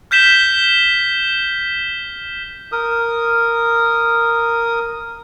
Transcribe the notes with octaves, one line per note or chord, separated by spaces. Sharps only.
F6 G6 B6 E7 G7
A#4 D#6